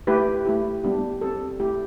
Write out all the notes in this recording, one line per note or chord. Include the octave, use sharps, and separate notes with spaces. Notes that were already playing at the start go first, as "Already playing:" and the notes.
A3 E4 G4 B4
A3 E4 G4
G3 B3 D4 G4
C4 G4 A4
A3 E4 G4